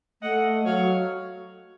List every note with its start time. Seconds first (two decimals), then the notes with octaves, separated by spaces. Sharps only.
0.22 A3 D#5 F#5
0.65 F#3 C#5 F5